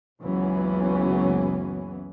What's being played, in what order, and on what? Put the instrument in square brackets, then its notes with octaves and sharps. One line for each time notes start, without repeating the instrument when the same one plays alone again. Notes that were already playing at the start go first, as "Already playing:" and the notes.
[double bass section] F#1 C#2 E3 F#3 B3 C#4